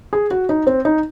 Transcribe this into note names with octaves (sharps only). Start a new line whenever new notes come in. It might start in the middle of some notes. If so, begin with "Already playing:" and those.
G#4
F#4
D#4
C4
D#4